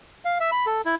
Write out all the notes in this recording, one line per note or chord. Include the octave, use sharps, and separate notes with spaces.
F5
E5
B5
A4
E4